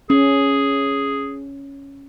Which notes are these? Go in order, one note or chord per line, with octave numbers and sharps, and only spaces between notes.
C#4 G#4